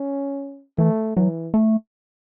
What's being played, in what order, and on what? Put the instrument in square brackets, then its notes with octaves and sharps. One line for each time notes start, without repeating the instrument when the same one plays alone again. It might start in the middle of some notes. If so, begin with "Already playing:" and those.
Already playing: [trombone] C#4
[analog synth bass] E3 [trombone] A3
[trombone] E3 [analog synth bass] F#3
[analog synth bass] A3